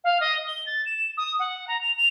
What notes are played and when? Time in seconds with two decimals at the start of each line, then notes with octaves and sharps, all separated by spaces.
0.04 F5
0.21 D#5
0.47 G7
0.66 A6
0.86 E7
1.17 D#6
1.39 F#5
1.68 A#5
1.81 F7
1.97 F7